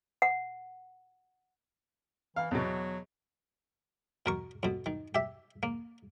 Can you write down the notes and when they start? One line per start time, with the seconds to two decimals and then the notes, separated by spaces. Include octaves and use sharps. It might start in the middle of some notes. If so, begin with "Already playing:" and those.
0.22 F#5
2.36 E3 F5
2.51 E2 B2 F#3
4.26 B2 A#4 C#6
4.63 F2 B2
4.86 D#3
5.15 G4 E5
5.63 A#3